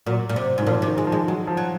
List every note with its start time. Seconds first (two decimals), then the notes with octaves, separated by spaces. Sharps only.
0.06 A#2 F#3
0.29 A#2
0.36 C3
0.58 G#2
0.63 D#3
0.66 A#2 F3
0.82 C3
0.88 D#3
0.98 G#3
1.07 F3
1.12 G#3
1.27 F#3 G#3
1.47 F3
1.57 F#3